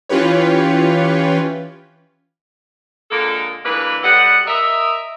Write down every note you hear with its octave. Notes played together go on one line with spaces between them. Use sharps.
E3 C#4 F4 G4 B4 C#5
A#2 D3 G#3 A#3 A4 A#4
D2 E3 G#3 A#3 D4 B4
F#3 G3 B3 A4 D#5 F#5
A#4 D#5 E5